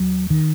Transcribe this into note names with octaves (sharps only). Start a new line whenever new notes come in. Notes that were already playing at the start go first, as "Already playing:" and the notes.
Already playing: D#2 F#3
D#3